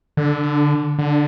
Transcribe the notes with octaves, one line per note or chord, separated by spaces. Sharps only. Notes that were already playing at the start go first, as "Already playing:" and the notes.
D3
D3